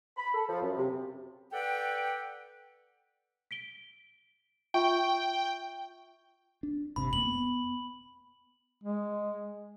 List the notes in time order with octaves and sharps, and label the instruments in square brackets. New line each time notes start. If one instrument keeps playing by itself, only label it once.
[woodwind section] B5
A4
F3
F#2
C3
A4 B4 D5 F#5 G5
[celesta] B6 D7 G7
[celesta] F4 E5 C#6 [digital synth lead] G5
[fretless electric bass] D4
[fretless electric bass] G1 C3 C4 [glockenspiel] B5
[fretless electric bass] F#2 G#3 A#3 [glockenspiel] F#7
[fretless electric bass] B3
[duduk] G#3